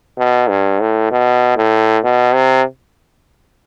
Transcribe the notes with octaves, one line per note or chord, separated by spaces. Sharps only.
B2
G2
A2
B2
A2
B2
C3